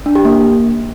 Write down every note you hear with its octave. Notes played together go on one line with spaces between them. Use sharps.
D4
G4
A#3